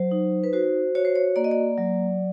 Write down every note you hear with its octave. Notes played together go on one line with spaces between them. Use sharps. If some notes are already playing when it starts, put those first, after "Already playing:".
Already playing: F#3 C5
D#4
B4
F#4 C5
F#4 C#5
C5
C#5
A#3 D5
D#5
D5
F#3